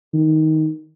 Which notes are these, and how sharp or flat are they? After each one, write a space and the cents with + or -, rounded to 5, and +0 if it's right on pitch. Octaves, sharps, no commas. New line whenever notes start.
D#3 +10